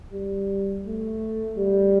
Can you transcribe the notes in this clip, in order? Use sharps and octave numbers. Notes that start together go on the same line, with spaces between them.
G3
A3
G3